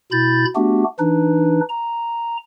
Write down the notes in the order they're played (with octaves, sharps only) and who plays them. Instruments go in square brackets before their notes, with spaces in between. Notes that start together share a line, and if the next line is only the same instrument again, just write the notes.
[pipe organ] B2 E4 B5 G6 A6
A3 B3 D4 F#4 G4
E3 D4 D#4 B4
A#5